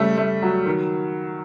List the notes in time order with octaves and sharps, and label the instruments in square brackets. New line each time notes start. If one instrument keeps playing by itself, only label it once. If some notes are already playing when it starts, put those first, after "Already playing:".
Already playing: [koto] C#3 [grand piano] G3 A3
[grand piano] A3
F#3
D#3